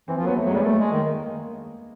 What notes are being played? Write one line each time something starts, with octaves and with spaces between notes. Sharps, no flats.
E3 C4
F3
A#3
F#3 B3
A3
F#3
G#3
G3
A3 A#3
G#3
D#3